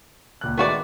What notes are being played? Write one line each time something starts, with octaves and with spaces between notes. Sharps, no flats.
C#2 A#2 F#6
D#3 G#3 A3 B3 F#4 D5